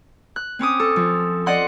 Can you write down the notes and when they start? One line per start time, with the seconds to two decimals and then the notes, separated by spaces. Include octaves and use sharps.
0.36 F#6
0.59 C4 C#4 D6 D#6
0.80 A4
0.96 F3
1.46 D5 D#5 F#5 C6